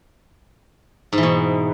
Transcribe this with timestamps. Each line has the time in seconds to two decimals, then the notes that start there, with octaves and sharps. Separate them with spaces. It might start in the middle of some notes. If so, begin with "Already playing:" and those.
1.13 G#2
1.18 E3
1.23 B2